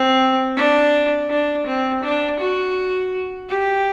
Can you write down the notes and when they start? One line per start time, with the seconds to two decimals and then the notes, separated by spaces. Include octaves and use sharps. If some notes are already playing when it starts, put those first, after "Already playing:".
Already playing: C4
0.57 D4
1.30 D4
1.66 C4
2.03 D4
2.40 F#4
3.50 G4